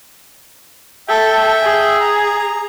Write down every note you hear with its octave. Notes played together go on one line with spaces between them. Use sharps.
A4 E5 G5
G#4
A#5